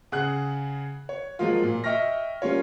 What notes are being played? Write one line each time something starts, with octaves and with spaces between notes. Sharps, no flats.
C#3 G#4 F#5 F#6
C#5
F3 F#3 G#3 A#3 F4
A#2
D#5 E5 G5 C#6 F6 A#6
G3 A#3 C#4 F4 C#5